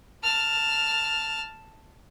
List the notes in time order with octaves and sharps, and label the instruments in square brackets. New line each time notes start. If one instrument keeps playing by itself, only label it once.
[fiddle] A5 F6